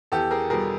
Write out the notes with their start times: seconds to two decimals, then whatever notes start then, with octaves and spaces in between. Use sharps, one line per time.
0.12 E2 G4 A4
0.31 G#4 A#4
0.50 B2 G3 G#4 A#4